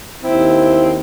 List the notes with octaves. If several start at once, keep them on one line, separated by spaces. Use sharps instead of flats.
D#2 C4 E4